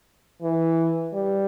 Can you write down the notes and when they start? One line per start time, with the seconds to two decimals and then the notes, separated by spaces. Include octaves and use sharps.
0.42 E3
1.14 G3